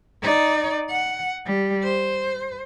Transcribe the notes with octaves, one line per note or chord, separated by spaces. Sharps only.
D#4 D5
F#5
G3
C5